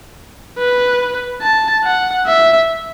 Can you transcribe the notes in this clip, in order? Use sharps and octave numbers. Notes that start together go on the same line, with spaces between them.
B4
A5
F#5
E5